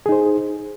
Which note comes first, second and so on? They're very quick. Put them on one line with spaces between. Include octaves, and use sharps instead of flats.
G#4 D#4 C5